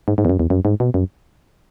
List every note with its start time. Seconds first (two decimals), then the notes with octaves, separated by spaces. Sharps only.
0.08 G#2
0.18 G#2
0.25 E2
0.30 F#2
0.39 E2
0.50 F#2
0.65 G#2
0.80 B2
0.94 F#2